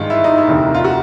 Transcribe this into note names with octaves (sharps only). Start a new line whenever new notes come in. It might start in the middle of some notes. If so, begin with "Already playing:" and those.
Already playing: G#1 G2 D#3 G#3 F4
E4
D#4
E4
F1 D#2 D3
F4
F#4